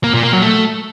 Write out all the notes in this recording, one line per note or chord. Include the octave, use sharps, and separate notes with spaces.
A#3
A#2
A#3
F#3
A3